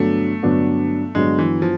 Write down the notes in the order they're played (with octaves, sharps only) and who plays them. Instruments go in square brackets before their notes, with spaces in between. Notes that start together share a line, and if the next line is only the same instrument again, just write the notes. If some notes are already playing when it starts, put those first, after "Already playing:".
Already playing: [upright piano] G2 D3 F#3 B3 D4 [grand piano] A3
[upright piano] G2 D3 F#3 B3 D4
[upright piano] G2 D3 F#3 B3 D4 [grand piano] G#3
[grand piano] E3
F3